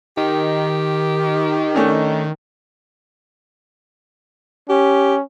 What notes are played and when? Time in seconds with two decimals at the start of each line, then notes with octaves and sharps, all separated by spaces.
0.17 D#3 G4
1.74 A3 C#4 D4
4.69 C#4 G4